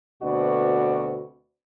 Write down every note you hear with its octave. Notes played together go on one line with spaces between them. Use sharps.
D2 B2 C4 F#4 B4 D5